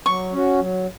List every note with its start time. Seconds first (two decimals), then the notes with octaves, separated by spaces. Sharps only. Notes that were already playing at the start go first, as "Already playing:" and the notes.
0.06 F#3 C#6
0.33 C#4 F#4
0.60 F#3